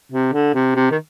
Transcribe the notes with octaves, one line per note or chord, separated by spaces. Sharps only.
C3
D3
C3
C3
D#3